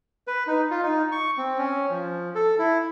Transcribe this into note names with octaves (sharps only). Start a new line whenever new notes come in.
B4
D#4
F4
D#4
C#6
C4
C#4
F3
A4
E4